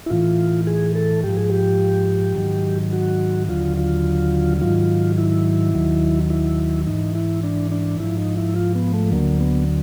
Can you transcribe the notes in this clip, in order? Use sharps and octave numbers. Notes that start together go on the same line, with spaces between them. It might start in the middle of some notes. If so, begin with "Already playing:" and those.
E4
A2 E3 F4
G#4
A4
G#2 F3 G4
G#4
G4
G#2 D#3 F#3
F#4
D#2 D3 F#3 F4
F4
G#2 D#3 F#3 F4
E4
D#2 D#3 F#3
E4
G#2 E3 D#4
E4
D4
D4
G#2 F3 E4
D#4
E4
F4
B3
A3
D2 D3 F#3 A#3
B3